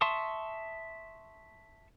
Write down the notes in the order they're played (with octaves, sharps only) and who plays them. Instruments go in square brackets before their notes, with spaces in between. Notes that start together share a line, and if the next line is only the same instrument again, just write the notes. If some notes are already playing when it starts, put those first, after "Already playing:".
[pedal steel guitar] E5 A5 C6 C#6 D#6